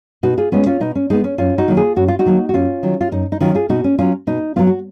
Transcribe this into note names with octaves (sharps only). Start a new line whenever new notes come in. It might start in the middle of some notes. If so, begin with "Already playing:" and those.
B2 D#4 F#4
F4 G#4
G#3 B3 C#4 F4
C#4 F4
B2 D#4
C#4
G#3 B3 D#4
C#4
F#2 C#4 F4
D#4 F#4
D#3 F#3 A#3
F4 G#4
F#2 F#4
F4
D#4 F#4
D#3 F#3 A#3
F#4
F#2 C#4 F4
D#3 F#3
F4
F#2 D#4
D#4
D#3 F#3 C#4 F4
F4 G#4
B2 D#4 F#4
C#4
F#3 B3 C#4 F4
B2 D#4
F#3 B3 F4
F#4